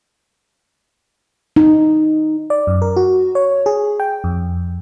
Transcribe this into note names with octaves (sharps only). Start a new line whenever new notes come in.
D#4
D5
F#2
A#4
F#4
C#5
G#4
G5
F2